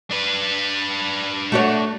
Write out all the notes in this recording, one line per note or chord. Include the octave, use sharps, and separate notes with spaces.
D4 B4
A3 F#4 C#5